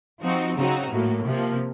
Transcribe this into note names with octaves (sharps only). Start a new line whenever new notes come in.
F3 C4 D#4 F#4
C#3 F#3 C4 D#4 F#4
A2 F#3 A#3
C3 F3 A#3